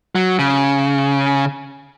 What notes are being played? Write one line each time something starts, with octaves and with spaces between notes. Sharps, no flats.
F#3
C#3